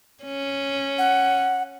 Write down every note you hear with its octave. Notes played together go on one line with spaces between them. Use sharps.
C#4
F#5